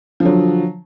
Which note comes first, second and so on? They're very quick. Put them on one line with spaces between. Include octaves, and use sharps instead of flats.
F3 D3 F#3